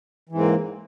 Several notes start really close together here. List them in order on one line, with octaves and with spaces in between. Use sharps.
E3 G#2 C4 A#3